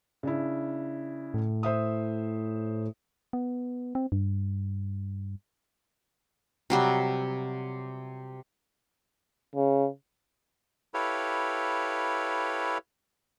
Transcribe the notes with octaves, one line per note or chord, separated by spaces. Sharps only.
C#3 D4 E4
A2
C5 E5 D#6
B3
C4
G2
C3 F#3 G3
C#3
E4 G4 A4 B4 C#5 F5